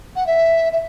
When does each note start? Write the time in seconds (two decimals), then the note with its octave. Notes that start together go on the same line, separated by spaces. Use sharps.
0.16 F#5
0.26 E5
0.72 E5